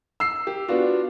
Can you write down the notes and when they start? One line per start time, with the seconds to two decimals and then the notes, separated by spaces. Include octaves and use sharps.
0.20 E6 C7
0.47 G4
0.68 B3 D4 F4 F#4